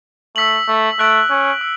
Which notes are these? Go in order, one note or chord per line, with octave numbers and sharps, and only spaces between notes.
A3 E6 B6 F#7
A3
A3 F#6 B6 D7 F#7
C#4
E6